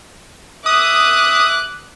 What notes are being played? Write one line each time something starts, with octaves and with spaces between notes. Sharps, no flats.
E5 D6 D#6 F#6